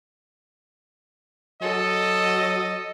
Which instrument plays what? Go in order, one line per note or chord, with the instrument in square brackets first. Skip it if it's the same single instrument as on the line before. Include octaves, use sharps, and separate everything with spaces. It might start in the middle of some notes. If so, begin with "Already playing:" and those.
[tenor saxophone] F#3 [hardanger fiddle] A4 [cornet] D#5